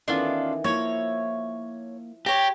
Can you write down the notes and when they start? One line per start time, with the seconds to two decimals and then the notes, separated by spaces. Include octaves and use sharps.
0.08 D#3 E3 B3 C#4 D4 F4 A4 D5
0.64 F3 A#3 E4 C#5 E5
2.26 G4 C#5 A#5